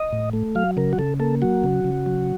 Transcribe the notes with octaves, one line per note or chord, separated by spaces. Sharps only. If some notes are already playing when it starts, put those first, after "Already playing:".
Already playing: D#5
A2
A3
F#3 F5
C#3 A#4
F#4
C#3 A4
A#3 A4
F#3 F#4
C#3
C#3
F#3